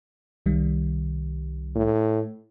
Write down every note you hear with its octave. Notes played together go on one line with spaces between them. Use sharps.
C2 D#3 G3
A2